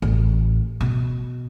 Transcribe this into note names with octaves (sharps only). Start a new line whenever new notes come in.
A1
B2